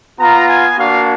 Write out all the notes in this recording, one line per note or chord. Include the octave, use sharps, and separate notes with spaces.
B3 F4 A#5
G#5
A#3 D4 F#4 F5